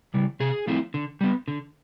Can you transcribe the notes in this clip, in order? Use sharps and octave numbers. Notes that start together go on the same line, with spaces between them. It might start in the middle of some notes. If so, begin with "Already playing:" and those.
C#3 E3 G3
C3 G#4
F3 A3 C4 E4
D3
G3 B3
D3